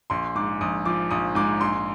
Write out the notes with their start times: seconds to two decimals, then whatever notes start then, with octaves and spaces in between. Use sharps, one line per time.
0.10 A#1 C6
0.35 G#2 D6
0.61 A#1 D#6
0.86 F3 D6
1.11 A#1 D#6
1.35 G#2 D6
1.61 A#1 C6